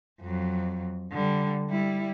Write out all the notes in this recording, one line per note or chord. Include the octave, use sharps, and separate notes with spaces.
F2 F#3
D3 G3
G3 E4